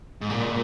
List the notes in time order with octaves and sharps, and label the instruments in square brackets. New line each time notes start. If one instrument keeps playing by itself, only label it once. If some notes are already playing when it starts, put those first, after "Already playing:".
[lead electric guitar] G#2
A#2